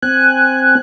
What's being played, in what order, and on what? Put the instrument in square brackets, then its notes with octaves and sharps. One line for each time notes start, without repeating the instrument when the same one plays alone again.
[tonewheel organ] C4 G#5 [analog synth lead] F#6